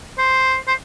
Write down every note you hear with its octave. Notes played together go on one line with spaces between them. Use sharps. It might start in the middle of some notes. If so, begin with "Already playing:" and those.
C5
C5